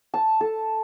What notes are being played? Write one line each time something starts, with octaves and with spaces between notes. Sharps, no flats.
A5
A4